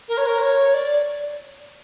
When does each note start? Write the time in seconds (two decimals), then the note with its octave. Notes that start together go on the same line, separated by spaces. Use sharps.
0.08 A#4
0.17 C#5
0.26 A#4
0.41 C#5
0.74 D5